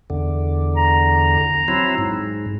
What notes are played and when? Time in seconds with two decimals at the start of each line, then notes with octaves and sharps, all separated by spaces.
0.10 E2 D3
0.76 A#5
1.68 F#3 C4 E4
1.98 G#2